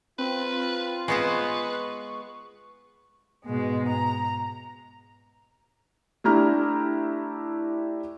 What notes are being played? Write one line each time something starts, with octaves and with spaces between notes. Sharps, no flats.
C4 F4 B4
G#3 B3 B4 C5 C#6
G#2 B2 G#3
A#5
A3 D4 E4 G4 A#5 F6